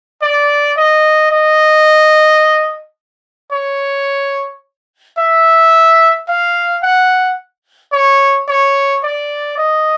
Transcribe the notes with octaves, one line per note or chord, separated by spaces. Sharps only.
D5
D#5
D#5
C#5
E5
F5
F#5
C#5
C#5
D5
D#5